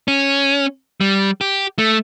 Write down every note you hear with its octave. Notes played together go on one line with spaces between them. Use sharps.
C#4
G3
G4
A3